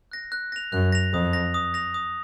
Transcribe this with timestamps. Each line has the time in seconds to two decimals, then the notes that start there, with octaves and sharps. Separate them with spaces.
0.12 F#6 A#6
0.32 F#6
0.52 A#6 F7
0.72 F#2 F#6
0.92 A#6 F7
1.13 F2 D#6
1.33 A#6 F7
1.54 D#6
1.74 A#6 F7
1.94 D#6